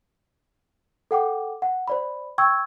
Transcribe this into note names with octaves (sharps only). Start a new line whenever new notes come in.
A4 F#5 G5 D6
F#5
C5 D5 B5
G5 C#6 E6 G#6